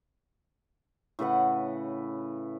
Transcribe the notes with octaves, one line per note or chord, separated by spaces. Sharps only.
A2 C#3 B4 F#5